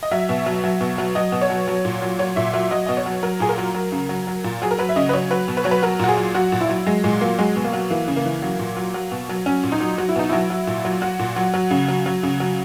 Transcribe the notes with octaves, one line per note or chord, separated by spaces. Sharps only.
D#5
F#3 E5
B2
F#3
F#3
B2
F#3
F#3 D#5
B2
C#5
F#3
F#3
A#2
F#3
F#3 C#5
A#2 E5
F#3 E5
F#3 D#5
B2 D#5
C#5
F#3
F#3 A#4
A#2 G#4
A#4
F#3
F#3
C#3
F#3
F#3
A#2
F#3 G#4
A#4
F#3 B4
E5
C#3 D#5
B4
F#3 C#5
F#3 B4
B2
B4
F#3 C#5
B4
F#3 A#4
A#2 F#4
G#4
F#3
F#3 F#4
A#2
E4
F#3
F#3 G#3
A#2 G#3
F#3 A#3
F#3 G#3
B2
A#3
F#3
E3 A#3
C#3
A#3
E3
F#3
A#2
F#3
F#3
B2
F#3
F#3 C#4
A#2
D#4
F#3
F#3 F#4
E4
B2 D#4
F#3 E4
F#3
A#2
F#3
F#3 F#4
A#2
F#3
F#3
C#3
F#3
F#3
C#3
F#3